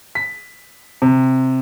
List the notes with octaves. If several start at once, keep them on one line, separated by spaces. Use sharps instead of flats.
B6
C3